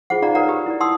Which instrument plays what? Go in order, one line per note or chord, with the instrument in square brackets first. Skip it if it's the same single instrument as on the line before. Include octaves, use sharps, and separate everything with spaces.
[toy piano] F4 G#4 C5 F#5
D#4 F4 D5 F5 F#5 A#5
A#4 B4 C#5 D5 F#5 A#5
F4 G4 B4
E4 D5
F#5 A5 C6 D#6 E6